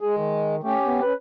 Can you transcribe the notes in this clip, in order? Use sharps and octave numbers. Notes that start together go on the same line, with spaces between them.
G#3 G#4
D#3
A3 C#4 G4
B3
C#4 B4